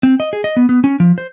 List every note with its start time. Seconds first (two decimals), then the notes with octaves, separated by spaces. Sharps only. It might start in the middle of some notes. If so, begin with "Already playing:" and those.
0.03 C4
0.20 D#5
0.33 G#4
0.44 D#5
0.57 B3
0.69 B3
0.84 C#4
1.00 F3
1.18 C5